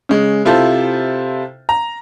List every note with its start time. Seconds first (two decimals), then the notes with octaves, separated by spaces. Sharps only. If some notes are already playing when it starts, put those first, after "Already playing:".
0.09 C#3 G#3
0.45 C3 E4 F4 A4 C5
1.69 A#5